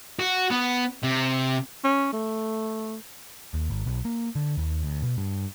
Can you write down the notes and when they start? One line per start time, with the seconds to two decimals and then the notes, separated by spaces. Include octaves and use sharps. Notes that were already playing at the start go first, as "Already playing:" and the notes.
0.19 F#4
0.51 B3
1.03 C3
1.84 C#4
2.13 A3
3.54 D#2
3.70 G#1
3.86 B1
4.05 A#3
4.35 D3
4.57 D#2
4.83 D2
5.02 B2
5.17 G2